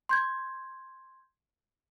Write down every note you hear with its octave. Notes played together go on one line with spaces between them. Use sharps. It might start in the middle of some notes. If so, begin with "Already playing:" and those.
C6 G6 G#6